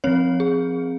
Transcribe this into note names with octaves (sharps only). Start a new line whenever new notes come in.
F3 C4 C#5
G#4